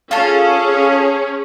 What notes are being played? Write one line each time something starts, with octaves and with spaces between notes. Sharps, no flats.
C#4 F4 G#4 A4